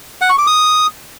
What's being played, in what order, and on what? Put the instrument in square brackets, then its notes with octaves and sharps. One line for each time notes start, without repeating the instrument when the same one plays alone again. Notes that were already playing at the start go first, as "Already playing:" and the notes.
[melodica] F#5
C#6
D6
D#6